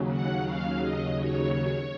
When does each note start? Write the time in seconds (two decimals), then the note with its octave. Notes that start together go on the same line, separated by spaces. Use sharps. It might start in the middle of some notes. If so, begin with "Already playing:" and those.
Already playing: D#2 C#3 F#3
0.09 F#5
0.45 F5
0.81 D#5
1.18 C#5